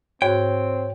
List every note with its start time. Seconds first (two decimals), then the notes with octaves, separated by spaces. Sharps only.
0.22 G#2 C4 F#4 C#5 G5